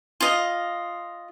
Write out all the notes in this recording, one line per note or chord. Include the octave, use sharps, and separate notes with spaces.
F4 D#5